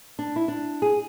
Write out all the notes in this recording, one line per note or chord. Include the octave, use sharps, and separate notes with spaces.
D4
E4
D4
G#4